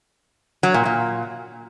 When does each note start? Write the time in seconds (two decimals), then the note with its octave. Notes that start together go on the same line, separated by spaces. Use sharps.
0.63 F#3
0.74 A#2
0.85 A#2